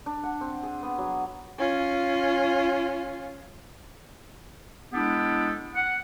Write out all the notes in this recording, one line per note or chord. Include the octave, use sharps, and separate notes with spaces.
D4
F#5
C4
G#4
B3
F#3
C#4 F4
G#3 B3 D4 E4 G4 A4
F#5